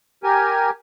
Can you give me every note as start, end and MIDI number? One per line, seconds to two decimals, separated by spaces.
0.23 0.70 67
0.23 0.70 70
0.23 0.70 80